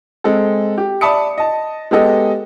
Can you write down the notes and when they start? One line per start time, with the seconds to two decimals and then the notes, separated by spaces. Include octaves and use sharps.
0.24 G#3 C4 A4
0.78 G4
1.01 D5 E5 A5 B5 D#6 C#7
1.38 D#5 A5
1.91 G#3 B3 G4 A4 D#5